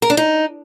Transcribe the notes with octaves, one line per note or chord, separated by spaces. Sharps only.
A#4
D4
D#4